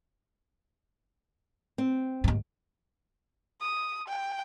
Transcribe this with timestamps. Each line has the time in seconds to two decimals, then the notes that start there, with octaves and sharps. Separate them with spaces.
1.78 C4
2.24 D#2 G#2
3.61 D#6
4.08 G5